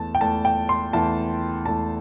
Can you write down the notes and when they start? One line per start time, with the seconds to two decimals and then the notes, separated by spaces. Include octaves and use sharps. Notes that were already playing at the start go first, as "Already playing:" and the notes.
Already playing: E2 E3 A3 A5
0.15 G5
0.21 E2 E3 A3 A5
0.45 G5
0.69 C6
0.93 E2 E3 A3 A5
1.66 E2 E3 A3 A5